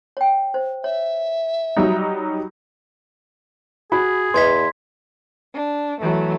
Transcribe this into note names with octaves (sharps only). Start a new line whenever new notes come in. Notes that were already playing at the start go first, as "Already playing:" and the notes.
C#5 G5
C5
C#5 E5
F#3 G3 D#4
F#4 G#4 B5
E2 B4 D#5 C6 G#6 B6
D4
E3 F#3 A3